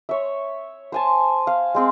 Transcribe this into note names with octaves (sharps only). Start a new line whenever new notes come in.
C#5 E5
C5 G#5 A5
F5
G#3 C4 G#4